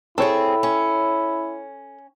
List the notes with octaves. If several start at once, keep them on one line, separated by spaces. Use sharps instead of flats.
C4 E4 G#4 A4 C#5
C#4